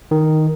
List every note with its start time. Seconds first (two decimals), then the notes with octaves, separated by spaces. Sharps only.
0.11 D#3